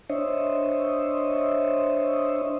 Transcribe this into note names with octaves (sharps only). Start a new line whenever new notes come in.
D4 C5 C#5 D#5 E5